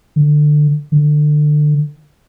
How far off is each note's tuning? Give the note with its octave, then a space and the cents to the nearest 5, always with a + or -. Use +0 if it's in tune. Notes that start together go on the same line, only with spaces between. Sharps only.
D3 +20
D3 +25